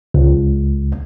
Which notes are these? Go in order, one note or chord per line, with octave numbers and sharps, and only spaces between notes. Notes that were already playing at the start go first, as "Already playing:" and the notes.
C#2